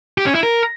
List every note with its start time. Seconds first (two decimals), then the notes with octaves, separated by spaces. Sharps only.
0.18 G4
0.26 C#4
0.35 E4
0.43 A#4